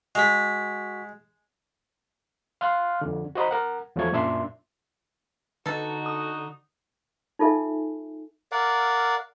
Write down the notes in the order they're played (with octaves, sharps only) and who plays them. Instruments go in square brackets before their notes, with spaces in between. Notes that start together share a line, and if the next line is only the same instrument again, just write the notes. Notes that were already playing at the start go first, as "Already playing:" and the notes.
[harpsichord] G#3 [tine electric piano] F#4 B6
[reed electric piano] F5 C6 F6 F#6
F2 D3
F#4 C5 D#5 A#5 B5
A#4 F#5
E2 F3 F#3 A3 C#6 G#6
F#2 A#2 D4 E5 C6
[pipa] B2 A4 [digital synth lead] D3 [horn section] D#4 F#4
[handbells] D#6
[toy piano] D#4 F4 A4 E5 G#5
[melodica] A#4 D5 F5 F#5